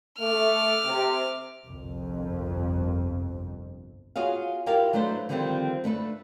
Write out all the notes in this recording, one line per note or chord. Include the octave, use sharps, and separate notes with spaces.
A3 D6 F6
C3
G1 C2 F2
F4 F#4 G#4 C#5 F5
E4 F4 G4 A#4 F5
F#3 A3 D4 B4 C5
D3 D#3 F3 G3 C4 F4
A3 D4 A4 B4